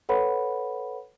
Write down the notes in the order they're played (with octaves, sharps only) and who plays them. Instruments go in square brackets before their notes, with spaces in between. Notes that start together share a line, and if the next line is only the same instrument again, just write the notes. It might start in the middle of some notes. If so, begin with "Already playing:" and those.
[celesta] A4 B4 C#5 F#5 B5